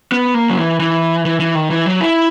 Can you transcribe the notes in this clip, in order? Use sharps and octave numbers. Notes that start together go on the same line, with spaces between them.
B3
A#3
F#3
E3
E3
E3
E3
D#3
E3
F#3
E4